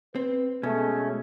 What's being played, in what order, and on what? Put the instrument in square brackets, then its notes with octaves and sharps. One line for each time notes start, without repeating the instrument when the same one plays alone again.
[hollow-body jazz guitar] C4 [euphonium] B4
[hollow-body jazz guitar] B2 [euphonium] G#3 [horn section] A3 [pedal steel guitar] C#4